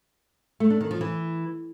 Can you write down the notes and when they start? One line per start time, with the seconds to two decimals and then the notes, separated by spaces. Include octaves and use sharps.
0.60 A3
0.70 D4
0.81 D#3
0.91 F3
1.01 E3